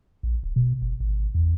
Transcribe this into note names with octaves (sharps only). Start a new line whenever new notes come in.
A#1
D1
B2
F#1
G#1
E2